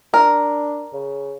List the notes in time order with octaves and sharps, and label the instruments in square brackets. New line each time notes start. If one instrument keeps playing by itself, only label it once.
[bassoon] D4 [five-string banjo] A#4
[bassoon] C#3